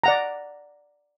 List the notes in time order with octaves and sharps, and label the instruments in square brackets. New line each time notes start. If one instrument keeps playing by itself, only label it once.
[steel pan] D5 F#5 A#5